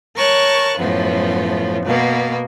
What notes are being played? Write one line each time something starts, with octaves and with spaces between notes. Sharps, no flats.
A#4 C#5 A5 C#6 F#6
F#2 A2 F3 B3
B2 A#3 B3